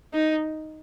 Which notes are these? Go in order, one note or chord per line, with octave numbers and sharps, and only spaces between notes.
D#4